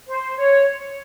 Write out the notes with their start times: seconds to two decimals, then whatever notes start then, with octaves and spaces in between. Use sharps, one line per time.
0.07 C5
0.37 C#5